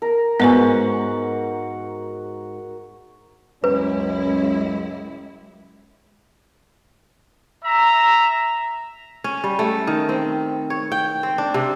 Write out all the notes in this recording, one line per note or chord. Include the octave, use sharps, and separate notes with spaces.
A#4
G#2 B3 F#4 B4 F#5 G#5
C#2 F#2 C#4 E4 B4
E5 A#5
C#4
G3
A3
D#3
C4
C#5
G5
C4
D4
C3